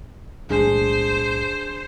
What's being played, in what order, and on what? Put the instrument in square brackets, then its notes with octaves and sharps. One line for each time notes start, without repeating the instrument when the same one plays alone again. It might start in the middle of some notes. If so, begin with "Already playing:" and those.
[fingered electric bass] B1 A2 G#3 [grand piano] D4 G#4 [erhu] C5